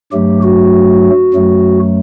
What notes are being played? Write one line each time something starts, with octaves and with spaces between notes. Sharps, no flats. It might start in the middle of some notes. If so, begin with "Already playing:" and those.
G2 F#3 A3 G4
F#4
F#2 F#3 A3